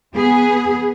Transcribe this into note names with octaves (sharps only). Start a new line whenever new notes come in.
B3 G#4